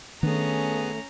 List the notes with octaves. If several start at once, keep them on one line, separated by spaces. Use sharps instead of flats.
D#3 A3 B3 C#4 D4 G#4 A#5